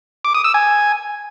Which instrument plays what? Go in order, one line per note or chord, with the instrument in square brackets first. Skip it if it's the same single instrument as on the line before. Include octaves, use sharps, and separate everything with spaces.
[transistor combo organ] D6
D#6
E6
G#5